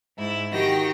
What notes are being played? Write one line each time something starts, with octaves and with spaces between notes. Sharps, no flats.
G#2 E4
D#3 F#4 G4 G5 A#6